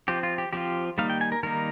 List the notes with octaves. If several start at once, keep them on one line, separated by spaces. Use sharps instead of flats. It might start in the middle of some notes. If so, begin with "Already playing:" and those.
F3 C4 F4 G4
F4
G4
F3 C4 F4 G4
D#3 G3 A#3 D#4 F5
G5
G#5
A#4
D#3 G3 A#3 D#4 A#4